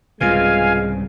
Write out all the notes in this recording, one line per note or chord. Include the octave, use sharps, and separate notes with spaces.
C2 G#2 C#3 G#3 F4 B4 F5 G#5